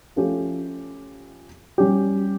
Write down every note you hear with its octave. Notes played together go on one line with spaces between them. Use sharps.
F3 A3 C#4 G4
G3 C#4 G4